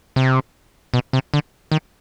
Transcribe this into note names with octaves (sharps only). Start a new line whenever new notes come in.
C3
B2
C3
D3
D#3